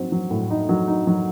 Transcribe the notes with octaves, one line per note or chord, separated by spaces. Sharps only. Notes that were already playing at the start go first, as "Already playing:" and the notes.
Already playing: F#3 C4 D#4
F#3
A2
D#4
F#3
D#4
F#3